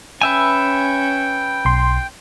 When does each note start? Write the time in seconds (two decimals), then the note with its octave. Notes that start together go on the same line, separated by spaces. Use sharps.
0.21 C#4 B4 E5 G5 G#5
1.65 B1 C6